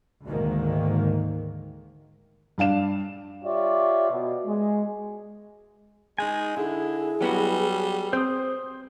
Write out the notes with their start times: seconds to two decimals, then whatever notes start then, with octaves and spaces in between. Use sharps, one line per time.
0.25 D2 G#2 D#3 A#3
2.58 G2 D4 F5 E7
3.44 F4 G4 C#5 D5 E5
4.11 B2
4.45 G#3
6.18 G#3 D#4 G#5
6.57 D3 E4 G#4
7.21 F#3 G3 B3 F#4
8.13 C4 C5 D#6